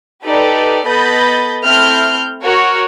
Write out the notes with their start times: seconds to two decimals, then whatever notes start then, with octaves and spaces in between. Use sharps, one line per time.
0.23 D#4 G4 A4 B4 D5
0.86 B3 A4 D#5 B5 G6 A6
1.64 A3 C4 E4 F6 G6
2.43 F#4 A#4 C#5